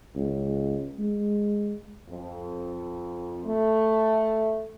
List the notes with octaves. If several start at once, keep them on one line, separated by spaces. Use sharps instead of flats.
C#2
G#3
F2
A3